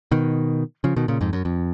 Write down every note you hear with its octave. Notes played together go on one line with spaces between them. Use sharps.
B2 D#3
C#3 F3
B2 D#3
A#2 C#3
F2 G#2
F#2
F2